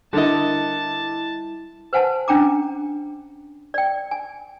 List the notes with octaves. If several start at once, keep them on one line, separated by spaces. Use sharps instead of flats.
D3 G3 E4 A4 A#4 D#5 A5
B4 C5 F#5 G#5 A5
C#4 D4 G5 A#5 D6
D5 G5
G#5